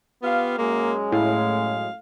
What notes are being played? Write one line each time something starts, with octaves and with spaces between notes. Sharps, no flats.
B3 F4 G4 F5
F#2 G#3 A#3
A2 F5